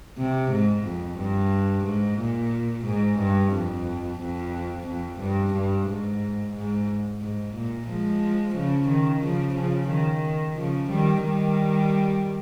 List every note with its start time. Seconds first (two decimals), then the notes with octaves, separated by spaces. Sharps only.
0.18 C3
0.52 G#2
0.85 F2
1.18 G2
1.85 G#2
2.19 A#2
2.86 G#2
3.19 G2
3.53 F2
4.20 F2
4.87 F2
5.20 G2
5.54 G2
5.88 G#2
6.54 G#2
7.21 G#2
7.55 A#2
7.88 F3 G#3
8.55 C#3 F3
8.89 D#3
9.22 C#3 F3
9.56 C#3 F3
9.89 D#3
10.56 C#3 F3
10.90 D#3 G3
11.23 D#3 G3